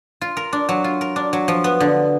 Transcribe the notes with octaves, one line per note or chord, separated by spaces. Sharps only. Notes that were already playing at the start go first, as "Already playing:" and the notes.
F4
A#4
D4
F#3
F4
A#4
D4
F#3
F3
B3
D3